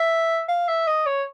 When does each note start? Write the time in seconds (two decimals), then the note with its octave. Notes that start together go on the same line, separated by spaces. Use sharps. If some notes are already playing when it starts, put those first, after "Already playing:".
Already playing: E5
0.49 F5
0.68 E5
0.87 D#5
1.06 C#5